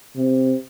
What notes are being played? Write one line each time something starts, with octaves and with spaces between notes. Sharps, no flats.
C3